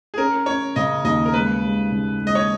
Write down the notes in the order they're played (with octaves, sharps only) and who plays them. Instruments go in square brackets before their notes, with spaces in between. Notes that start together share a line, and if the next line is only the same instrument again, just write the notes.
[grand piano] G#4
[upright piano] C#4 [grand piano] A#4
[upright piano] C#4 [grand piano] C#5
[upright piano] C#3 [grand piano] D#5
[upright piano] D#2 [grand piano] D#5
[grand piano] A#4
[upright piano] G#3 [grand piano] B4
[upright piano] G#3
C#3
G#3
[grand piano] D#5
C#5